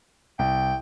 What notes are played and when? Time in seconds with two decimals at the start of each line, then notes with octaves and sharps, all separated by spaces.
0.39 C2 G5